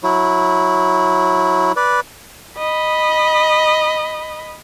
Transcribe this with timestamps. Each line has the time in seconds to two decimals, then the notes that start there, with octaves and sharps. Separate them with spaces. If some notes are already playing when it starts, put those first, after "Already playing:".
0.03 F#3 E4
1.76 B4 D5
2.58 D#5 B5